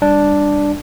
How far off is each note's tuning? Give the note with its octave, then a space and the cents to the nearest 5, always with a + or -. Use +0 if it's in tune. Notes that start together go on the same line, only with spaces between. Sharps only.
G3 +20 D4 +0